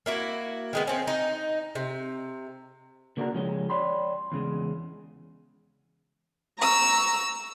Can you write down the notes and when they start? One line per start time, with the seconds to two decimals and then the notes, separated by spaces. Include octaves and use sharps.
0.06 A#3 E4 F#4
0.73 D#3 G#3 B3
0.87 C4 C#4
1.07 D#4
1.75 C3
3.17 C#3 A#3 D4 F4 F#4 A#4
3.34 C#3 F3 G#3 C#4 G4
3.70 C#5 D5 G5 B5 C6
4.32 E2 C#3 G#3
6.59 A#5 C#6 E6